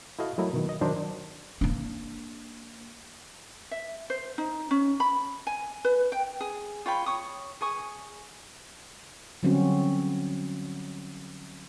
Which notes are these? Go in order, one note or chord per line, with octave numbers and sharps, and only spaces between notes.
E4 F#4 A4 D#5 F5
F#3 A3 E4 A#4 D#5
B2 D#3
D#5
D#3 F#3 D4 A#4 C5 D#5
A#3 D4
E5
C5
D#4
C#4
B5
G#5
B4
G5
G#4
F4 C#5 G5 B5
C#5 C#6 D#6
G#4 G#5 C#6 D#6
D3 F#3 G3 C4 C#4 F#4